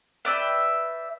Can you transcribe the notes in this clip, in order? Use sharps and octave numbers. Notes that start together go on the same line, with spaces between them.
B4 D5 E5 G5